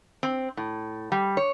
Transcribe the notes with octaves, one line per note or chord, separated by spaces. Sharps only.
C4
A2
G3
C#5